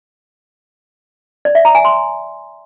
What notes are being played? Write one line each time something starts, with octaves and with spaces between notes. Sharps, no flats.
D5
E5
A#5
G#5
C6